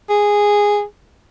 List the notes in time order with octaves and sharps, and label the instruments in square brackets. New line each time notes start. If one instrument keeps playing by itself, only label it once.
[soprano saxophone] G#4